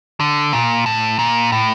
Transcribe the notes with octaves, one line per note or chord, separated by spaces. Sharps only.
D3
A#2
A2
A#2
A2